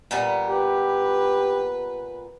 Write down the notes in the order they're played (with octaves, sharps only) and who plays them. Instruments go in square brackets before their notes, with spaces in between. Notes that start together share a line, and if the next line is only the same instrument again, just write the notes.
[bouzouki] A#2 G3 B3
[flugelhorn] G4 [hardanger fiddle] B4